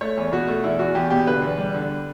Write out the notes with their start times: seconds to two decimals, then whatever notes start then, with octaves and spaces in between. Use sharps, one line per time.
0.01 A3 C#5
0.17 E2
0.32 B2 F#4
0.47 A3
0.63 E2 E4
0.79 E2 F#4
0.95 E2 G4
1.10 B2 G4
1.27 D3 B4
1.42 E2
1.58 G3
1.74 D3